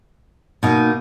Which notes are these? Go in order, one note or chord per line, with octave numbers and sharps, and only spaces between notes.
B2 A#3 D#4